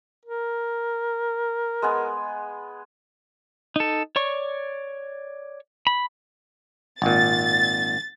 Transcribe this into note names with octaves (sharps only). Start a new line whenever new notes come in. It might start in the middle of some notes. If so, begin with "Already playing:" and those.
A#4
G#3 B3 G#5
D#4 A4
C#5 D5 C#6
B5
G#1 A#2 A6